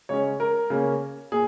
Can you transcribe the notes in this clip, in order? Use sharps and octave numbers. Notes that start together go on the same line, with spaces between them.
C#3 G#3 C#4 C#5
A#4
C#3 A#3 C#4
A#2 G#4